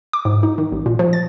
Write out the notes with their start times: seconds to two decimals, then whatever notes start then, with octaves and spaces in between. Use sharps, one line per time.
0.13 D6
0.25 G#2
0.43 D#4
0.58 D#3
0.72 A1
0.86 A#2
0.99 F3
1.13 A6